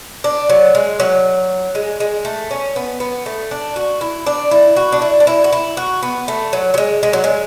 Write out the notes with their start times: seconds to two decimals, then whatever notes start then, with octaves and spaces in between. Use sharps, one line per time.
0.24 D4
0.50 F#3
0.75 G#3
1.00 F#3
1.75 G#3
2.00 G#3
2.25 A3
2.51 C#4
2.76 B3
3.00 B3
3.26 A3
3.51 D4
3.76 F#4
4.01 E4
4.27 D4
4.51 E4
4.76 F#4
4.92 D4
5.02 E4
5.20 D4
5.27 E4
5.44 F#4
5.52 E4
5.77 F#4
6.03 B3
6.28 A3
6.53 F#3
6.74 F#3
6.78 G#3
7.03 G#3
7.13 F#3
7.24 G#3